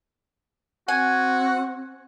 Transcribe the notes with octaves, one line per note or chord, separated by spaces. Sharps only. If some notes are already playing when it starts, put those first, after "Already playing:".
C4 F#4 F#5 G#5